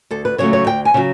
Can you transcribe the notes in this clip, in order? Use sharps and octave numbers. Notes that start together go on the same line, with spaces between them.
D2 A4
B4
C#3 F#3 A3 C#5
C#5
D2 G5
G#5
C#3 F#3